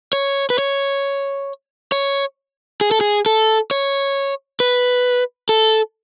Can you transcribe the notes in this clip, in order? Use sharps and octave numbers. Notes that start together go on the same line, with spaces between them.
C#5
B4
C#5
C#5
G#4
A4
G#4
A4
C#5
B4
A4